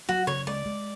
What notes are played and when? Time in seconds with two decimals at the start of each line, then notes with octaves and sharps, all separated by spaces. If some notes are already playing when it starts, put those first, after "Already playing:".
0.09 F#3 F#4
0.27 C#3 C#5
0.47 G#3 D5
0.66 G#3